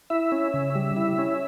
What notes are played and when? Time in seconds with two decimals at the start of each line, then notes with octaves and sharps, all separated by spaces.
0.10 E4 E5
0.32 C#4
0.54 C#3
0.75 G3
0.96 E4
1.18 C#4